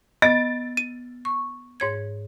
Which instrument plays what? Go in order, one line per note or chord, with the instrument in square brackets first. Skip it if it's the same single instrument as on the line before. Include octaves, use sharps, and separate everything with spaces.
[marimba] B3 [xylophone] D#5 [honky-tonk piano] A6 D7
[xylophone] D#7
[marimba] C#6
G#2 C#5 G#6